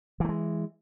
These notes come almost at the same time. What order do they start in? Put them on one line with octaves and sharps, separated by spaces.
E3 A3 G#3